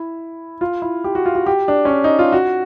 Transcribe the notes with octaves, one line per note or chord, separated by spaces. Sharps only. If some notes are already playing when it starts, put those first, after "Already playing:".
Already playing: E4
F4
E4
G4
F#4
F4
F#4
G4
D4
C#4
D4
D#4
F4
F#4